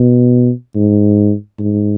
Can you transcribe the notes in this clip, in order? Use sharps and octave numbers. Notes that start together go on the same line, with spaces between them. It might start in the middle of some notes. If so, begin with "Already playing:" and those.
Already playing: B2
G#2
G#2